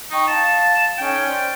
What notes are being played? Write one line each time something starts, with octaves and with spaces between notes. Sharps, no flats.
D#4 D#5 G5 C#6
F5 A5
C#4 D#4 A4 G5
C5 D5